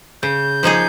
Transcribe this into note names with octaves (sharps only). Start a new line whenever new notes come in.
C#3 G6
F3 A#3 D#4 G#4